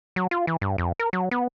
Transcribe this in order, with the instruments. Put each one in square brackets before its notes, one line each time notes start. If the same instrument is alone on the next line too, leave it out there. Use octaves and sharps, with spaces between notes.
[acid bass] F#3
F4
E3
G2
F2
A#4
F#3
B3